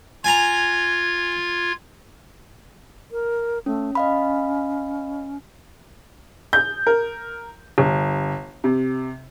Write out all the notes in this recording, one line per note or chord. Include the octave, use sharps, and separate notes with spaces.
F4 G#5 A#5 G#6
A#4
A3 C#4
C#4 D#5 F5 B5
G6
A#4
G1
C3